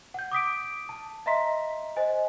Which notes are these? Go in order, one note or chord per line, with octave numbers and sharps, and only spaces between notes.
F#5 G6
D6 D#6 B6 D7
A5
D#5 E5 A#5 C6 B6
C5 D#5 G#5